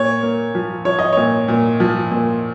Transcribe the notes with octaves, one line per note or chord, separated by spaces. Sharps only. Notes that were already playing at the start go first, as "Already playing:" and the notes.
Already playing: A#2 C#5
A#3
F3
F3 C#5
D#5
A#2 C#5
A#2
F3
A#2